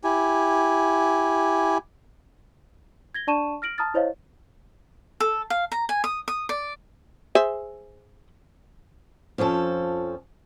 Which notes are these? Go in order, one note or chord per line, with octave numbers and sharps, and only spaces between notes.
E4 G4 G#5
G#6 A#6 G7
D4 D5 A5 C#6 D#7 E7
F6 A#6 D7 F#7
A5 A#5 D#6 F6 A6
E4 C5 C#5 D#5 F5
A4
F5
A#5
G#5
D#6
D#6
D5
G#4 C5 E5
F2 F3 C#4 A4